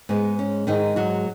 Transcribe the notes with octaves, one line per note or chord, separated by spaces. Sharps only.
G#2 G#3 B3
C#4
G#2 D#3 G#3 D#4
F#3 F#4